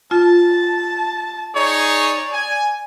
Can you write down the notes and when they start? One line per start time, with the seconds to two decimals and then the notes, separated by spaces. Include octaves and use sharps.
0.11 F4 A5
1.55 D#4 G#4 C#5 D5
2.32 G#5